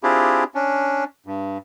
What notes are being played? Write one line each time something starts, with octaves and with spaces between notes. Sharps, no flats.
C4 D4 E4 F4 G4 G#4
C#4 D4
G2